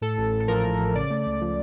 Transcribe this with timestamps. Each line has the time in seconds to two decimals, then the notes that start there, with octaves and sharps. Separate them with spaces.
0.01 A2 A4
0.18 A1
0.33 A1
0.40 A4
0.48 F3 A#4
0.64 A2
0.79 A1
0.95 C#3 D5
1.10 A3
1.26 C#2
1.41 F3